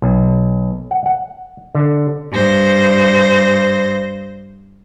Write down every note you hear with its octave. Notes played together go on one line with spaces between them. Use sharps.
B1
F#5
F#5
D3
G2 C5 A#6